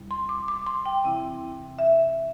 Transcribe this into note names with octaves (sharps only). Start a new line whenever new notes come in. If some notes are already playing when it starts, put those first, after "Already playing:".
Already playing: D2 C3 G3 C4 E4
C6
D6
D6
C6
G5
E2 C3 E3 C4 E4
E5